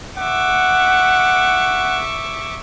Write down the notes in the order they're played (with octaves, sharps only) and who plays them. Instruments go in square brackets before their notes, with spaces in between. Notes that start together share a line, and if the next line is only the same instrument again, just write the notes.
[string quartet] E5 C#6 D6 [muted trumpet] F#5